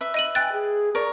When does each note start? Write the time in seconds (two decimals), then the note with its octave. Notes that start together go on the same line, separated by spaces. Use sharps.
0.01 B4 E5
0.14 D#5 D#7 F#7
0.35 G5 G#5 F#6 A6
0.53 G#4
0.95 A#4 C#5 D5